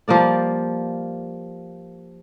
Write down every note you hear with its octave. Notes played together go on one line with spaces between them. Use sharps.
F3 G3 A#3 D5